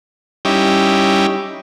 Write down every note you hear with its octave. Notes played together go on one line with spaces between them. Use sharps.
G3 C#4 D#4 E4 G4